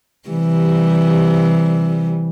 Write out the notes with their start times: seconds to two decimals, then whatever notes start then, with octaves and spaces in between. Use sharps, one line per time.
0.29 C3 E3 G3